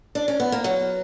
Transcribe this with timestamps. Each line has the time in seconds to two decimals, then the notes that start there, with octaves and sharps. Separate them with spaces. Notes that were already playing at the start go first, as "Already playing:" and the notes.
0.15 D4
0.28 C#4
0.40 B3
0.52 A#3
0.64 F#3